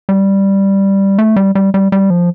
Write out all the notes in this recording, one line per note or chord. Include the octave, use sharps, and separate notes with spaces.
G3
A3
G3
G3
G3
G3
F3